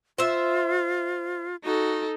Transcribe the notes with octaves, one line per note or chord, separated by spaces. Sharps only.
F4 C5 E5
D#4 F#4 A4